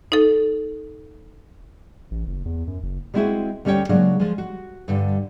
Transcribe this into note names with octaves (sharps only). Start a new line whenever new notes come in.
D#4 A4
A1
F#1
E2
F#2
F#1
G3 G#3 C4 E4 F#4 G#4
D2 G3 C#4 C5 C#5 G5
C#3 F#3 G#3 A#3 D4
F3 G#3
F#4
G2 D3